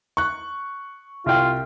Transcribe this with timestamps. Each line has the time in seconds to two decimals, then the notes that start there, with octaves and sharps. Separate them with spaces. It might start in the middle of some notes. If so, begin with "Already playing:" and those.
0.17 C#6 F#6
1.26 C2 F4 G5